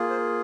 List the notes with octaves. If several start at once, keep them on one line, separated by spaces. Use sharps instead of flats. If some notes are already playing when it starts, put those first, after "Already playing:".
Already playing: A#3 F4 G#4
C5